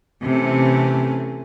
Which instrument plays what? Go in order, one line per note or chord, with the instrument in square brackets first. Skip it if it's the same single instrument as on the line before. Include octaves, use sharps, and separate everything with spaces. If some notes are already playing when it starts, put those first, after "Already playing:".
[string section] C3 [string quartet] E3 A3 C#4